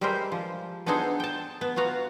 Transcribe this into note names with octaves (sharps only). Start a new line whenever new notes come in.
G3 G#3 G4 A#4 C5 E5
F3
B3 D4 D#4 G#4 A4 C5
G5 A5
B3
B3 F4 F#4 A#5